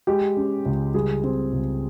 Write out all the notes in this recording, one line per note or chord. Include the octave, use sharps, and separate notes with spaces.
G#3 G4
C#4
C#2
G3 G#4
C4
C#2